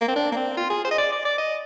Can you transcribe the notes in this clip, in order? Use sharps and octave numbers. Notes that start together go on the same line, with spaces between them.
A#3
C4
D4
A#3
C4
F4
G#4
C5
D#5
D5
D5
D5
D#5